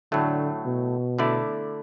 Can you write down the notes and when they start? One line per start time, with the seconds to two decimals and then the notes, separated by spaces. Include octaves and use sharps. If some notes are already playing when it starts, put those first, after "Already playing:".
0.12 A2 D3 F#3 A3
0.66 B2
1.19 D3 A3 E4 D5